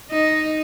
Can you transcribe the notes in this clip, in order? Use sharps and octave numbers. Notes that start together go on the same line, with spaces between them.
D#4